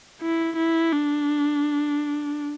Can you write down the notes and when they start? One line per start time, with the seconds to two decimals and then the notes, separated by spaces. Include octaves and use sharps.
0.21 E4
0.57 E4
0.92 D4